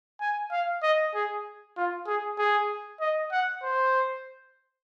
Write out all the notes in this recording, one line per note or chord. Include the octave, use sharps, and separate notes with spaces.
G#5
F5
D#5
G#4
F4
G#4
G#4
D#5
F#5
C5